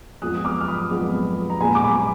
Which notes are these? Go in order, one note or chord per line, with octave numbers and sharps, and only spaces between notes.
F2 F3 G#3 B3 D#6 F#6
D#6
D6 F6
F6
B5 D#6
F2 F3 G#3 B3
A#5
A#2 G#3 B3 G#5 B5
D6
G#5 B5